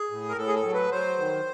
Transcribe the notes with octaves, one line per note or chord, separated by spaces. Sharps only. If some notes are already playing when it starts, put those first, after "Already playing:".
Already playing: G#4
A2
A#4
A2 A4
G#4
A4
F#3
B4
F#3 C5
D#3